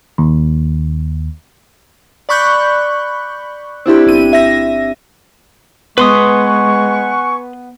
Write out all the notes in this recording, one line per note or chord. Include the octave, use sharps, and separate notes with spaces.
D#2
D5 B5 C#6 F#6 G6
C4 D4 E4 G4
G1 E4 D#7
E5 A#6
G#3 B3 B4 F#5 G#5 C6 C#6 D#6